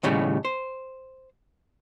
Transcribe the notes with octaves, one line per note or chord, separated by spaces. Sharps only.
D#2 A2 C#3 G3
C5